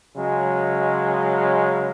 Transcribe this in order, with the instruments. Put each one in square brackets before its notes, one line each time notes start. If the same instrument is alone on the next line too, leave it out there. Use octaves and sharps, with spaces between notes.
[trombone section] C#3 F#3 G#3